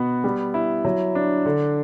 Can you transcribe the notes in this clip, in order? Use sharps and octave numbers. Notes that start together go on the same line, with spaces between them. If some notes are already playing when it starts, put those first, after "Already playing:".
Already playing: B2 B3 F#4
G3
E4
F#3
D4
D3